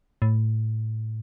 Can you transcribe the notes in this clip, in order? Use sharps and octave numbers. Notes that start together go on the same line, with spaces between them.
A2